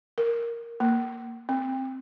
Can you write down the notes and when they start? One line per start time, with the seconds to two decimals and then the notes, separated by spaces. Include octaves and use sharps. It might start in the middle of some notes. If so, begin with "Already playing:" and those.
0.18 A#4
0.80 A#3
1.49 C4